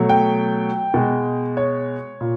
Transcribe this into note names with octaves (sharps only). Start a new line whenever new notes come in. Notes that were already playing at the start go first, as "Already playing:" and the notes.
Already playing: B2 F#3 A3
G5
B2 G#3
C#5
A#2